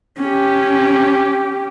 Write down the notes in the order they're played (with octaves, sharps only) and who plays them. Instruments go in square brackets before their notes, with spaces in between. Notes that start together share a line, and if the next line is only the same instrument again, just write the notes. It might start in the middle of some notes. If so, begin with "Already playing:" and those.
[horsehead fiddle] C#4 G4